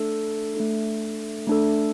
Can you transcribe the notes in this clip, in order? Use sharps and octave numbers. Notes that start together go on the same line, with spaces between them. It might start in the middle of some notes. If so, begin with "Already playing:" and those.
Already playing: A3 D4 A4
A3 D4 A4
A3 D4 A4